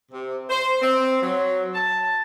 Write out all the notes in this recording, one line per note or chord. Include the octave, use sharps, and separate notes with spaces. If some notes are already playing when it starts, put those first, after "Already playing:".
C3
C5
C4
F#3
A5